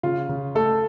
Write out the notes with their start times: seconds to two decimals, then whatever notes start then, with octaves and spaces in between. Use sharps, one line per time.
0.03 C#3 F4
0.29 C#3
0.55 A3 A4